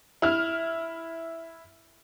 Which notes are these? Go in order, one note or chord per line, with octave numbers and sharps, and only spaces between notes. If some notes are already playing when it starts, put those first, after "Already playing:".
E4 F6